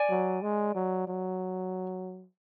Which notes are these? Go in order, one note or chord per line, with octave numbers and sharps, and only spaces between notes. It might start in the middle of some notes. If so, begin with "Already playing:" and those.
Already playing: D5 G#5
F#3
G#3
F#3
F#3